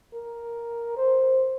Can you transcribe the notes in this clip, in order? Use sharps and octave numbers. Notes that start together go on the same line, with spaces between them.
A#4
C5